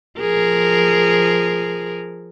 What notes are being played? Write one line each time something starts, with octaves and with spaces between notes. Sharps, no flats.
F3 G#4 A#4